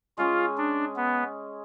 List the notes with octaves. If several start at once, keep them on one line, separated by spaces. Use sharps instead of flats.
G#3 C#4 F4 G#4
D4
B3